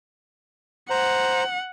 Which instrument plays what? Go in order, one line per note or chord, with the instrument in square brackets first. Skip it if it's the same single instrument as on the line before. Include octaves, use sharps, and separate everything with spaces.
[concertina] C5 A#5 [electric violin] F#5